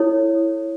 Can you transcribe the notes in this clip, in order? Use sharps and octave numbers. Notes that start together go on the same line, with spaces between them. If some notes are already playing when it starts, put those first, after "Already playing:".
Already playing: E4 A4 C#5